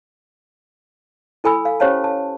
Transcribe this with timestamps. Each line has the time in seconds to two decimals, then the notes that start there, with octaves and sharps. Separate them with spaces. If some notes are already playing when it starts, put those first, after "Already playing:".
1.44 E4 A4 G#5 B5 E6
1.65 F5
1.80 C#4 G4 C5 C#5 F5 A5
2.04 A5